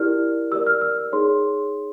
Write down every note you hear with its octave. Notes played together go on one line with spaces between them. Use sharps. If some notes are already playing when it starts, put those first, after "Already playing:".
Already playing: E4 G4 A#4 D5 F6
G4 A#4 D5 E6
F6
E6
D#4 G#4 C#5 C6